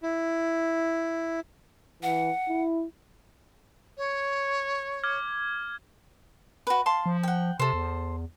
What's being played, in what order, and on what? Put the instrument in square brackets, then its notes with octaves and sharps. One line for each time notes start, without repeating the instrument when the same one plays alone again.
[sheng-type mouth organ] E4
[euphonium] E3 [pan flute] F#5
[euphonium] E4
[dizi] C#5
[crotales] D6 F6 G#6
[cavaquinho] F#4 B4
F5 A5 C6
[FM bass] F3
[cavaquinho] F#5 G5
[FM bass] C3 [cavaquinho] A4 C5
[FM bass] E2